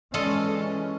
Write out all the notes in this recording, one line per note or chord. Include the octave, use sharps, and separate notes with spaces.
E3 G#3 C#4 F4 A4 D#5